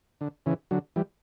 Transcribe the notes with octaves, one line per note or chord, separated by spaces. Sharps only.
D3
C#3 E3
D3 F#3
E3 G3